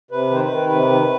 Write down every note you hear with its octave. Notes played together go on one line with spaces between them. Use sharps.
C3 B4
D#3 C5
B4
D#3
C3 B4
D#3